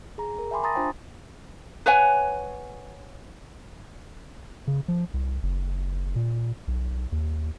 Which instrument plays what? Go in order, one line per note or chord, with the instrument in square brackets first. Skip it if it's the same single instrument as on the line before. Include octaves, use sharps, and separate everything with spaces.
[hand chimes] G#4 A#5
A#4
E5 G5 G#5 B5 C6 D6
A5 A#5 C6 D#6 A6 A#6
D4 F4 C5 G5
[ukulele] B4 C#5 F#5 G#5
[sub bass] C#3
F3
C2
F#1
A#2
B1
D#2